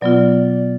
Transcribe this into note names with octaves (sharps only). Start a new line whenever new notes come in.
B2 F#3 B3 F4 D5